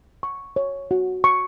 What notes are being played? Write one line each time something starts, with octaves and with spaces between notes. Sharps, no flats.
C#6
C#5
F#4
C#6